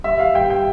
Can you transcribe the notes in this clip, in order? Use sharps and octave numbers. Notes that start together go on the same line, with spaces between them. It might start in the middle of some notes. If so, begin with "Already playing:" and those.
G3 E5
G3 F5
G2 G5
G5